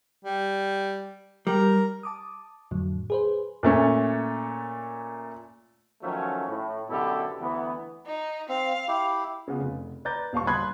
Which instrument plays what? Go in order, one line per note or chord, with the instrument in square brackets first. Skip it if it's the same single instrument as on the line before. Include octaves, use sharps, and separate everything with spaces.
[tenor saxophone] G3
[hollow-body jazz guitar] G3 [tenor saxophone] A#4
[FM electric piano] A5 D6 D#6
F2 A2 D3 F#3
G#4 B4 C5
[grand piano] A#2 A3 C#4
[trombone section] D#3 F3 F#3 A3 C#4
A2
F#2 B2 D3 E4 G4 A4
D2 E3 B3
[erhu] D#4
[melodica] C4 [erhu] F5
[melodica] E4 G4
[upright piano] C#3 B3 F4
F1
B4 D5 A#5 G6 A6
D#1 F5 A5 C#6
A5 B5 C6 D#6 F#6 G#6